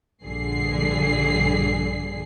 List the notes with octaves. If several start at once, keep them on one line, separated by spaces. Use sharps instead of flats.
A#1 G2 D3 G#4 C7